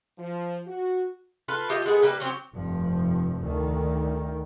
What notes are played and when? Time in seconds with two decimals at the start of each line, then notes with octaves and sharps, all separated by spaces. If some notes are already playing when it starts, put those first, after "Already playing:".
0.18 F3
0.67 F#4
1.48 F4 A4 B4 F5
1.70 A3 F4 G4 D#5
1.86 G#3 B3 G#4 A4
2.02 G3 A#3 B4
2.20 F#3 C4 C#4 G4
2.54 F1 G2 F3
3.41 D2 D#3